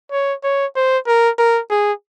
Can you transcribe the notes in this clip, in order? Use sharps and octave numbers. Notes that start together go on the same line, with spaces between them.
C#5
C#5
C5
A#4
A#4
G#4